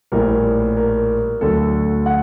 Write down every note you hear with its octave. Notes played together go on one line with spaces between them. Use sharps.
A#1 A2 G3 A#4
A#4
D2 D3 F#3 A4
F#5